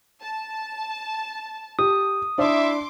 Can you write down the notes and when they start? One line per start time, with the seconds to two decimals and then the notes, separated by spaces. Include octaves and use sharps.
0.22 A5
1.79 G4 D#6
2.38 D4 E4 D5 E5 C6 D6